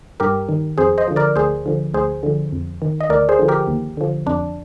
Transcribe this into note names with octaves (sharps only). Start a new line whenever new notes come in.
G2 G4 A#4
D#3
F2 G#4 C5
C5 D#5
D3 F3
A#4 D5
D2 G#4 C5
D3 F3
D2 G#4 C5
D3 F3
F2
D#3
D#5
D2 A#4 D5
G#4 C5
D3 F3
G4 A#4
D#2
D3 F3
F2 D4